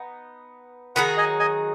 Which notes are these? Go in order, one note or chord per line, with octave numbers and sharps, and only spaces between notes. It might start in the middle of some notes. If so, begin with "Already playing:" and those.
Already playing: B3 D#4
D#3 F#3 D#4 G#4 F#5 B5
D#5 G#5
D#5 G#5